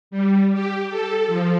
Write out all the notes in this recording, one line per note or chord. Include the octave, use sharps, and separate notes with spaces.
G3
G4
A4
F3